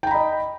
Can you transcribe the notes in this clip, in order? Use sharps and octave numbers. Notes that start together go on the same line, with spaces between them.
D#5 G5 A#5 B5